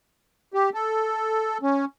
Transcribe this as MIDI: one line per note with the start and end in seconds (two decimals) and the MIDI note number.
0.54 0.70 67
0.74 1.58 69
1.63 1.85 61